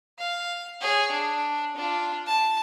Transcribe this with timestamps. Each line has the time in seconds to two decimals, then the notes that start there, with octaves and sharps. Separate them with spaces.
0.19 F5
0.81 G#4 C#5
1.11 D4
1.76 D4 F4
2.27 A5